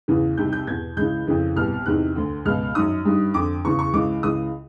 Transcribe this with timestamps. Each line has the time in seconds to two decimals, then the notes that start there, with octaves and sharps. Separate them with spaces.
0.08 E2 C#3 E3
0.37 C2 C3 D#3 G6
0.53 G6
0.67 E2 B2 G#6
0.97 C#2 C#3 E3 G6
1.27 F2 C#3 E3
1.56 C2 B2 F6
1.86 E2 C3 D#3 F#6
2.16 D2 D3
2.45 C#2 B2 F6
2.75 F#2 D#3 D#6
3.05 G2 D#3
3.34 F2 D3 D6
3.64 E2 C#3 E3 C#6
3.79 C#6
3.93 C#2 C#3 E3 D6
4.23 C#2 C#3 E3 D#6